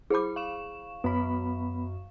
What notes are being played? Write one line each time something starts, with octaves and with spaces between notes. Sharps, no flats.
E4 G#4 C5 B5 D6
F5 C#6 E7
F#2 B3 B5